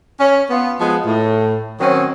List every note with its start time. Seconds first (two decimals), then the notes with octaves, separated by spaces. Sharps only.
0.20 C#4
0.50 B3 F4
0.80 F3 G#3 B3
1.06 A2
1.80 D#3 F#3 C4 C#4